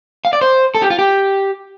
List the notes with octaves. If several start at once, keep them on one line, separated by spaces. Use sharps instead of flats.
F5
D5
C5
A4
G4
F4
G4